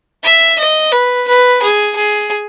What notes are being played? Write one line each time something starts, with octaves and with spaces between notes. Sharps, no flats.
E5
D#5
B4
B4
G#4
G#4